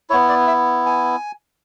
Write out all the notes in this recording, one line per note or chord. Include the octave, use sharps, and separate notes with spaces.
B3 E4 C#5
D5
E5
G#5